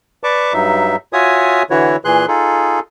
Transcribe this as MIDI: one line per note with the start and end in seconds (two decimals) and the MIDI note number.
0.24 0.53 71
0.24 0.53 74
0.24 0.53 81
0.24 0.53 85
0.24 0.53 86
0.53 0.96 43
0.53 0.96 54
0.53 0.96 63
0.53 0.96 76
1.13 1.63 65
1.13 1.63 66
1.13 1.63 73
1.13 1.63 76
1.13 1.63 80
1.13 1.63 87
1.70 1.96 50
1.70 1.96 52
1.70 1.96 64
1.70 1.96 66
1.70 1.96 73
2.05 2.26 46
2.05 2.26 52
2.05 2.26 68
2.05 2.26 84
2.05 2.26 90
2.28 2.80 63
2.28 2.80 65
2.28 2.80 68
2.28 2.80 69